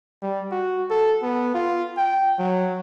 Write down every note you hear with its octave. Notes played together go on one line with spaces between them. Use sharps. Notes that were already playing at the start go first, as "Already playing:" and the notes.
G3
F#4
A4
B3
F4
G5
F#3